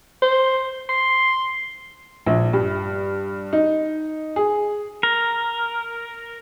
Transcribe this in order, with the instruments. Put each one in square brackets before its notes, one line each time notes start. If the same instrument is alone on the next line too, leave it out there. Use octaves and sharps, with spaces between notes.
[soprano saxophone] C5
C6
[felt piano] A#1
G2
D#4
G#4
[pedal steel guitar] A#4